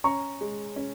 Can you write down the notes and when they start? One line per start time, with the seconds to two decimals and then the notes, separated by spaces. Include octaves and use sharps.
0.04 C#4 A#5 C#6
0.41 G#3
0.76 C#4